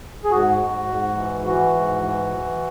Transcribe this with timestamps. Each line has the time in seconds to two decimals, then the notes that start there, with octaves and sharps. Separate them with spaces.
0.24 G#4
0.31 G#2 F#4
0.60 G#2
0.88 G#2
1.16 E3
1.45 E3 F#4
1.73 G#2
2.02 E3
2.29 E3